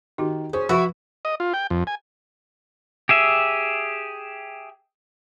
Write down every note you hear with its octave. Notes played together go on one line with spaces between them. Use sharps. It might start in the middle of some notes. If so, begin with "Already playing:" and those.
D#3 F#4 G4
C#4 G#4 C5
F3 E4 F#4 E6
D#5
F4
G5
F2
G#5
G4 G#4 E5